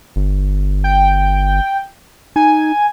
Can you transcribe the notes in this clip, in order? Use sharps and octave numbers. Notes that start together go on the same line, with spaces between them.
G1
G5
D#4 G#5